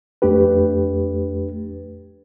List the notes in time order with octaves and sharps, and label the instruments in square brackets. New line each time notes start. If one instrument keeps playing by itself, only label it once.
[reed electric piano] F2 A3 D4 G4 B4